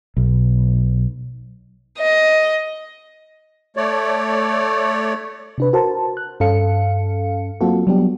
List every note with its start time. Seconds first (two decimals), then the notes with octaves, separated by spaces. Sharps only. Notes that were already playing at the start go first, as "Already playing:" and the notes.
0.17 B1
1.98 D#5
3.77 A3 C#5 D5
5.58 C3 D4 B4
5.73 F#4 A#4 C5 A5
6.17 F#6
6.40 G2 C#4 A4 F5 C#7
7.61 F#3 A#3 C4 F4 F#4 A4
7.87 F#3 G3 B3 D4 G4